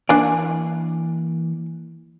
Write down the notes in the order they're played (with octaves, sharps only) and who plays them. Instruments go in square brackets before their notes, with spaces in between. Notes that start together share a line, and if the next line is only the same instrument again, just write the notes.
[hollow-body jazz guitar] E3 A#3 D5 [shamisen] D4 G#5